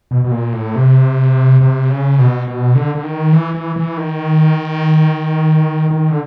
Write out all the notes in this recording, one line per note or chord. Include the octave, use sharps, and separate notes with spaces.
B2
B2
A#2
A2
C3
C3
C#3
B2
B2
D3
D3
D#3
E3
E3
E3
D#3
D#3
D3